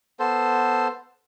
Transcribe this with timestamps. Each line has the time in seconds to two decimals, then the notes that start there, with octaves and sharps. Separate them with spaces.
0.20 B3 A4 C5